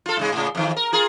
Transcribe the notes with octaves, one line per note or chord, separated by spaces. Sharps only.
F4 A4
G#2 C#3 G#3
A2 C#3
F2 D#3
A#4
F4 G#4 A#4